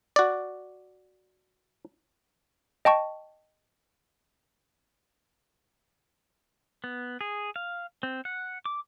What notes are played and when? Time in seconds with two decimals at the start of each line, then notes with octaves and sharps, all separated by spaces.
0.16 F#4 D5
2.85 D#5 G5 A5 C#6
6.84 B3
7.21 G#4
7.56 F5
8.03 C4
8.25 F#5
8.66 D6